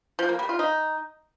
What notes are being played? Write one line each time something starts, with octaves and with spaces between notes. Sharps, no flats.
F3
A#3
G3
F4
D#4